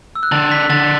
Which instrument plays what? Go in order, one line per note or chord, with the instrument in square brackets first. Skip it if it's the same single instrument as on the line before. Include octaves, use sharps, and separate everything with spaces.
[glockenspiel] E6
F#6
[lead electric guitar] D3 [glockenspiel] A6
[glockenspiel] B6
[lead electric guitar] D3 [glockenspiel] A6